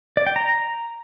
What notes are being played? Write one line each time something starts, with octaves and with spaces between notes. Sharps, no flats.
D5
G5
A#5